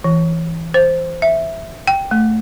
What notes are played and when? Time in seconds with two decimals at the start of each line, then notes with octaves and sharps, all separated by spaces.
0.04 E3
0.74 C5
1.22 E5
1.87 G5
2.11 A3